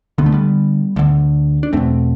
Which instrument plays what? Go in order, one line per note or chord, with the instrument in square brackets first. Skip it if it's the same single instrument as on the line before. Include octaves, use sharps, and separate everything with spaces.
[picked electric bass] D2 D3 B3
A3
G3 B3
D2 D3
D4
E2 B2 A3 C4